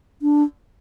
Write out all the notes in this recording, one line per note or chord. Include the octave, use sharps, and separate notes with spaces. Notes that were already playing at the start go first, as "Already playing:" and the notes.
D4